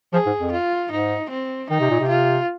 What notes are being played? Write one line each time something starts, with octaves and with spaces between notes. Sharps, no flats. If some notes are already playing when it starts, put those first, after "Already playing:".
F3 G#4
G#2
F2
F4
G#2 D#4
C4
D#3 D#4
C3
A#2
C3
F4